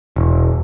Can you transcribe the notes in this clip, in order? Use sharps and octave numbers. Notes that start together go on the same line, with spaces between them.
E1